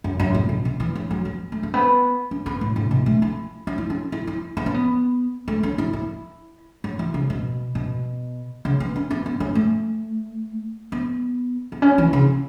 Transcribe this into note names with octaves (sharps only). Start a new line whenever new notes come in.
F#2
F#2
A2
B2
B2
E3
F#3
F#3
B3
A3
A3
B3
C#4
B3
A2
A2
B2
A3
E4
C#4
E4
C#4
E4
E4
B3
C#4
B3
A3
C#4
E4
E4
F#3
E3
C#3
B2
B2
C#3
B3
C#4
B3
B3
C#4
A3
B3
B3
C#4
E3
C#3